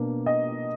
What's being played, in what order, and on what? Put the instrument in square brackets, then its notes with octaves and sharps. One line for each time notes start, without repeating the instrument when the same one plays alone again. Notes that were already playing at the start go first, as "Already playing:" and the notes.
Already playing: [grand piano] B2 A#3 D4
[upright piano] D#5